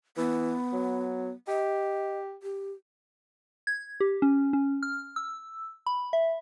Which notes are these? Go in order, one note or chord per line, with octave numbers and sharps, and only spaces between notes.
E3 B3
F#3
G4 D#5
G4
G#6
G4
C#4
C#4
F6
E6
B5
E5